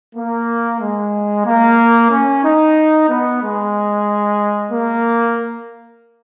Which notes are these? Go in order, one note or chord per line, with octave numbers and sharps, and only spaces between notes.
A#3
G#3
A#3
C#4
D#4
B3
G#3
A#3